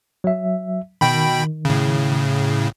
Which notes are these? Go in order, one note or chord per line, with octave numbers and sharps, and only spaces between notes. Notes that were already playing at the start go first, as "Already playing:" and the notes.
F#3 E5
B2 D#3 G5 B5
A2 C#3